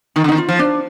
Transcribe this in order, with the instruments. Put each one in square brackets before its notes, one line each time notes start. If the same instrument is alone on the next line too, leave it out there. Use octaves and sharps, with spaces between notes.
[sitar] D#3 [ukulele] D#4
[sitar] D3
[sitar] D#3 [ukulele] D#4
[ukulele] F4
[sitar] F3
[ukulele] D4